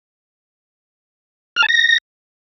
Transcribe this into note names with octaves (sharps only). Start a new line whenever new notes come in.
F6
A5
A#6